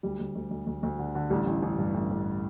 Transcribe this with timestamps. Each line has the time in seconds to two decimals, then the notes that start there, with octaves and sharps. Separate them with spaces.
0.03 D2 G3
0.19 D2
0.35 D2
0.51 D2
0.67 D2
0.83 D2
0.99 D3
1.15 D3
1.30 A1 G3
1.47 A1
1.62 A1
1.78 G2
1.94 A1
2.10 A1